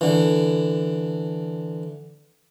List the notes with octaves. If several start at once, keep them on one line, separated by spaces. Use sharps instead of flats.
D3 E3